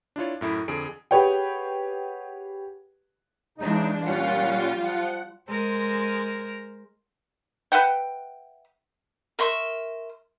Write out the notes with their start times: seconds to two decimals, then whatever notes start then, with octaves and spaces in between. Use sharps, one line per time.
0.16 D4 E4 F4 C#5
0.41 F#2 A2 E4 B5
0.68 F2 D3 G#4 D7
1.11 G4 G#4 B4 C#5 F#5 G5
3.58 C#3 E3 G#3 D4 D#4
4.06 A#2 G3 C#4 F4 F#5
4.84 F3 F#5
5.49 G#3 A#4 C5
7.72 B4 E5 F#5 G5
9.39 A#4 E5 C6 C#6